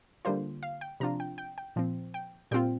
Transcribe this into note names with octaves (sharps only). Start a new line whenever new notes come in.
D3 G3 A#3 F4 C5
F5
G5
C3 F3 D4 F4 A#5
G5
G5
G5
A#2 F3 C4
G5
A#2 G3 C4 F4 G5